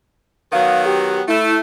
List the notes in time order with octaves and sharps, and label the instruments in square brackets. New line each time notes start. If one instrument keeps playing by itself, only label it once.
[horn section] D#3 F#3 B3 [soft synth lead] F5
[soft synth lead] G4
[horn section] A3 [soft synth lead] E4